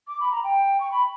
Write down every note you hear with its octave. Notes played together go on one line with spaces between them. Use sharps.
D6
B5
A#5
G5
C#6
B5